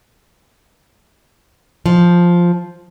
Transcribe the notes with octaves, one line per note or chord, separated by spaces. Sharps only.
F3